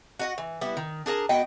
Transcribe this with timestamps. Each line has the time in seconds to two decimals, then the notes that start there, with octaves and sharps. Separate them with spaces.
0.19 F#4 D#5 F#5
0.38 E3
0.61 G3 B3 E4
0.77 D#3
1.06 D4 G#4 A#4 A5
1.29 B3 F#4 D#5 G5